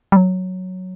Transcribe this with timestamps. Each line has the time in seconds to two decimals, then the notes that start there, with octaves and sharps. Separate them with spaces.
0.12 G3
0.16 F#3